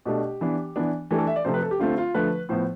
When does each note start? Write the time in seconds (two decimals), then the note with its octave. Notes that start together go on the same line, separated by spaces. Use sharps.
0.06 B2 A3 D4 G4
0.41 E3 B3 D4
0.76 E3 B3 D4
1.11 E3 A3 D4 G4
1.18 A4
1.27 E5
1.36 D5
1.45 C3 F3 A3 C4 C5
1.54 B4
1.62 A4
1.71 G4
1.79 D3 A3 C4 F4
1.98 F4
2.14 D3 F3 A3 B4
2.49 A2 F3 B3 C5